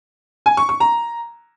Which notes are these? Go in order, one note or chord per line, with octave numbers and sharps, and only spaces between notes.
G#5
C#6
C#6
A#5